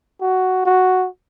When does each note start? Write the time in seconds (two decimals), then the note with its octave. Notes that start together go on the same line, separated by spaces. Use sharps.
0.21 F#4
0.66 F#4